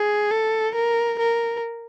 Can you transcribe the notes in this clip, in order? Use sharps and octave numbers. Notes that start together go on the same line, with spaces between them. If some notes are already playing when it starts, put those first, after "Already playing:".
Already playing: G#4
A4
A#4
A#4